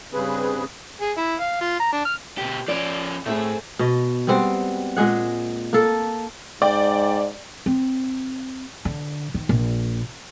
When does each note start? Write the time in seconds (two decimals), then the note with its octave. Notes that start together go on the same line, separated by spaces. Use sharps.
0.13 G2 C#3 C4 G#4 B4
1.01 G#4
1.17 E4
1.40 F5
1.61 F4
1.80 A#5
1.93 D4
2.05 F6
2.38 B2 G4
2.68 F3 C#4 D5
3.26 A2 A3 C4 G#4
3.79 B2 D#5
4.27 G3 G#3 B3 C4
4.97 A#2 G#3 G#4 F#5
5.73 A#3 A4
6.62 G#2 D5 G5
7.66 C4
8.85 D3
9.34 D#3
9.49 A#1